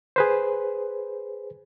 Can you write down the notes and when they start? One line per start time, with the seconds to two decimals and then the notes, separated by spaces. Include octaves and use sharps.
0.16 G#4 B4 C5